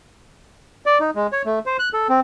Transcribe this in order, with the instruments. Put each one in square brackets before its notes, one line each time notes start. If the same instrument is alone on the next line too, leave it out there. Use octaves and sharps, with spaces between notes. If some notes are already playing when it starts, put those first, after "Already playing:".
[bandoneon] D5
D#4
G#3
C#5
A3
C5
F#6
A4
C4